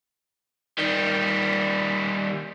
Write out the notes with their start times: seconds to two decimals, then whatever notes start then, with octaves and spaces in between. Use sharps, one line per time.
0.79 D#3 G3